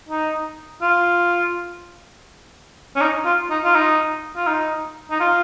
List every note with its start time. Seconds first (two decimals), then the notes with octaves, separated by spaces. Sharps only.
0.09 D#4
0.82 F4
2.96 C#4
3.01 D#4
3.25 F4
3.50 D#4
3.64 F4
3.75 D#4
4.36 F4
4.47 D#4
5.11 D#4
5.20 F4